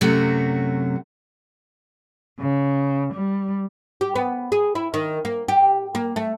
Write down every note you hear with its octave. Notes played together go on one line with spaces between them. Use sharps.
F#2 C3 F#3 A3 F#4
C#3
G3
G4
B3
G#4
E4
D#3
A#3
G4
A#3
A3